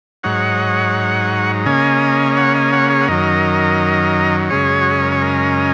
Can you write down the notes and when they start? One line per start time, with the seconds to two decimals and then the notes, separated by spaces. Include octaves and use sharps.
0.23 G#2 F#3 D#4 C#5 F#5
1.66 C#3 A#3 C#4 D#5 G#5
2.32 D#5
2.37 C#5 F#5
2.55 D#5 G#5
2.73 C#5 F#5
2.90 G#4 C#5
3.01 F#5
3.08 F#2 D#3 F#3 A#4 D#5
4.50 F#2 C#3 G#3 C#4 G#4 C#5
4.81 F#4
4.91 G#4
5.02 A#4
5.12 C#5
5.22 A#4 D#5